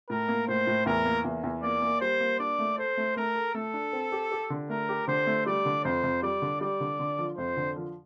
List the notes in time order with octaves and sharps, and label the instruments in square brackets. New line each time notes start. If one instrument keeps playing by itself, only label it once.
[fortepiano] A2 [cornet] A#4
[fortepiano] A#3
[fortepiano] A2 [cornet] C5
[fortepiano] A2
[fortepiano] E2 [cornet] A#4
[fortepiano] A#3
E2
E2
[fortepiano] A#3 [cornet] D5
[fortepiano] A#3
[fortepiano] G3 [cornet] C5
[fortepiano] A#3
[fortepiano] D4 [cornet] D5
[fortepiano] A3
[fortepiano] A4 [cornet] C5
[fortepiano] A3
[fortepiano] A3 [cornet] A#4
[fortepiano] A4
[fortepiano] A3 [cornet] A4
[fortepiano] D4
C4
G4
G4
D3
[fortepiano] A3 [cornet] A#4
[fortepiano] G4
[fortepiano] D3 [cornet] C5
[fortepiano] A3
[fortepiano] G3 [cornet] D5
[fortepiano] D3
[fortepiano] F2 [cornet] C5
[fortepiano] F2
[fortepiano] G3 [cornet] D5
[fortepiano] D3
[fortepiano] G3 [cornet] D5
[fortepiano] D3
D3
F3
[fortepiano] F2 [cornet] C5
[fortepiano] D3
F3